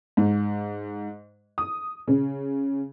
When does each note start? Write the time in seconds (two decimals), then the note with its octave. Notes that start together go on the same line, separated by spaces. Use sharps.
0.17 G#2
1.58 D#6
2.08 C#3